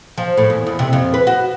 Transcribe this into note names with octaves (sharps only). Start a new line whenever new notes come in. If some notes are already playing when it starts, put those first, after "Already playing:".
F3
A2
E2
E2
C3
F2
B4
F#4